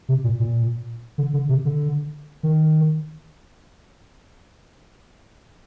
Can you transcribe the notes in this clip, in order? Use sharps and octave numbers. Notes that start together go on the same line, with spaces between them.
C3
A#2
A#2
D3
D3
C3
D3
D#3